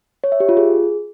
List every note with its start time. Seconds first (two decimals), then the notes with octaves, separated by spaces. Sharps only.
0.24 C#5
0.32 E5
0.40 G4
0.49 F4
0.57 G#4